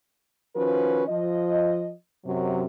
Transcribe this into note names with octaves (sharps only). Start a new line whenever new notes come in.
D#3 F3 C#4 F#4 B4
F3 D#5
F#2 C3 F#3